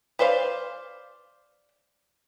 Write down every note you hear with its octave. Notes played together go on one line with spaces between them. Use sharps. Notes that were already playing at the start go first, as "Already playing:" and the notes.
B4 C5 D5 F5